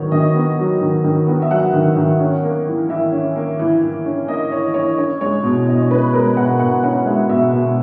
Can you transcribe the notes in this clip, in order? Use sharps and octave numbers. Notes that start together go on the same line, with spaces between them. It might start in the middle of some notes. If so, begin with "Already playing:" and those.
Already playing: D#3 F#3 B3 C#5
D#3 D#5
B3
F#3
D#3
D#3
B3
E5
F#3 F#5
D#3
D#3
C#4
A#3
E3
E3 E5
C#4
A#3
E3
E3
C#4
A#3 D#5
E3 C#5
E3 C#5
C#4 C#5
G#3 C#5
B2
B2 D#5
C#5
C#4 B4
G#3 A#4
B2 F#5
B2 F#5
C#4 F#5
G#3 E5
B2 E5
B2